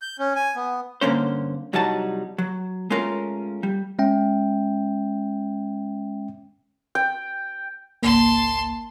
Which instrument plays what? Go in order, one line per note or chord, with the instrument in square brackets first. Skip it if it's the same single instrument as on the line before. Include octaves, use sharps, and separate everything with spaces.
[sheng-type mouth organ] G6
C#4
G#5
B3
[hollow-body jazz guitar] G2 D3 A#3 C#4 C5
C2 F#3 G3 D#4 F#4 A5
F#3
G#3 A3 C#4 F4 A#4
G3
[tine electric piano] G#3 C#4 E5 G5
[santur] G5
[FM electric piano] G#1 C#2 A#3 [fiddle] A5 C6